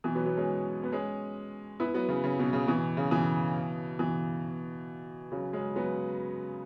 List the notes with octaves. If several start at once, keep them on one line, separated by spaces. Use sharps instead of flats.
B2 E3
F#3 B3
F#3 B3
G#3 C#4
B3
G#3 C#4
B3 E4
F#3 B3
C#3
C#3
B2
C#3
B2 E3
C#3
B2 E3
B2 E3
C#3 F#3
G#3 C#4
F#3 B3